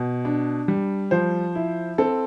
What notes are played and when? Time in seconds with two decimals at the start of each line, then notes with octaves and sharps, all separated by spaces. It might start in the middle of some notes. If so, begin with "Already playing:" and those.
Already playing: B2
0.25 D4
0.68 G3
1.11 F3 C5
1.55 E4
1.98 C4 A4